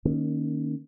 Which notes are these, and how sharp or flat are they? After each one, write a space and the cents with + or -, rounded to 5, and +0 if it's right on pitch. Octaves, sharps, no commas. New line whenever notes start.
D#3 -20 A#3 +0 C#4 +0